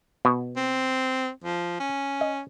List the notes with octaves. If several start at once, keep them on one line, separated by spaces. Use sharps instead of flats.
B2
C4
F3
C#4
D#5